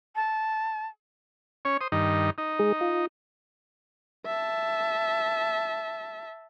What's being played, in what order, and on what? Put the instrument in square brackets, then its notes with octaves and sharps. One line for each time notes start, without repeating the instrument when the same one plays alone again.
[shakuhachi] A5
[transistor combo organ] C#4 C#5
C5 D#6
G2 D#3 D#4
D#4
[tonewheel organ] G#3 G#4
F4
[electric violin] E5 A5